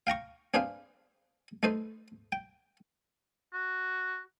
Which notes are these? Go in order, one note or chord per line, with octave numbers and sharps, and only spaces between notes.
F5 G5 A#5 C#6
C4 D4 G#4 B4 C5 F5
A3 D#4 A4 B4 C5
G5
F#4